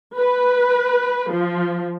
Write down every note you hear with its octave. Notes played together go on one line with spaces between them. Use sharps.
B4
F3